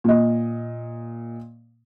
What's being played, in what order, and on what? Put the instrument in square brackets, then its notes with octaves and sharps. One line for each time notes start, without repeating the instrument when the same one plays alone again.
[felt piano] A#2 D#5